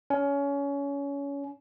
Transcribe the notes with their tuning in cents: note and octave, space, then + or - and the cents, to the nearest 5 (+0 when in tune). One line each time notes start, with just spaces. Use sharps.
C#4 +25